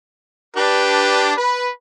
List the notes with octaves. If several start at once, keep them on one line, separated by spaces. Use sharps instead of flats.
D4 G4 B4
B4